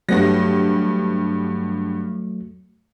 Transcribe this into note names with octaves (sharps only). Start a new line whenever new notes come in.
G2 F#3 A3 B3 A#6